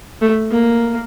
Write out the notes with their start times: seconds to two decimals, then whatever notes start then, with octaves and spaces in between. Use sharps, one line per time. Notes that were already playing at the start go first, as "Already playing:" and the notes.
0.21 A3
0.51 A#3